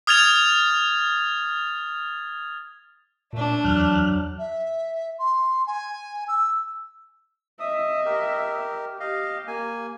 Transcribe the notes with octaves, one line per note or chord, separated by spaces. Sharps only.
D#6 F6 G#6 A6 F7
A#2 A3 D4
E2 F#3 F6 F#6
E5
C6
G#5
E6
D#5 E5 D#6
G4 A#4
G4 D#5 F5
A#3 G#5